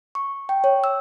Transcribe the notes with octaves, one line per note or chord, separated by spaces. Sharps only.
C#6
G5
C#5
E6